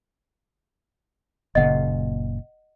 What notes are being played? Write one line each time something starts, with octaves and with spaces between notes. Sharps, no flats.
F#1 A#2 C#3 D#5 F#5